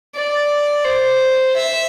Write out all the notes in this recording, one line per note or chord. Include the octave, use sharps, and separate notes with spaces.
D5
C5
E5